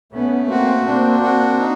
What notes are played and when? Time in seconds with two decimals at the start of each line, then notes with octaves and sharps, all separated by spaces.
0.12 A3 B3 C#4
0.49 A#3 C4 F#4
0.86 A#3 C4 D4
1.23 F#4
1.59 D#4